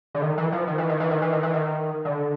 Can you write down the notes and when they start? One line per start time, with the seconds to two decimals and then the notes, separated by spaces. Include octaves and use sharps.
0.15 D3
0.22 D#3
0.38 E3
0.52 F3
0.68 D#3
0.78 E3
0.89 D#3
1.00 E3
1.11 D#3
1.22 E3
1.33 D#3
1.43 E3
1.54 D#3
2.05 D3